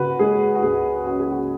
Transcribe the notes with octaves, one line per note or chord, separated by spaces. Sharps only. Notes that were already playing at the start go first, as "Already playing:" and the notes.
Already playing: C#3 C#4 F#4 B4
G#3 G#4
F#4
C#2 G#4
C#4 F#4
G#4
F#4